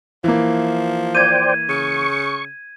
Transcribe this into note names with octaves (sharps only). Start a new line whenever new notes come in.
E3 F3 A#3
C5 D5 G5 G#6 D#7
C#3 C#6